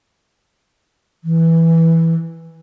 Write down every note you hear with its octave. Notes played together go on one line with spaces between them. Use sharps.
E3